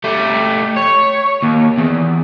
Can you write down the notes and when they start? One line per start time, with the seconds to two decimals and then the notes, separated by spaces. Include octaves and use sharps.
0.04 A3 G4
0.76 C#5
1.42 D#2
1.78 E2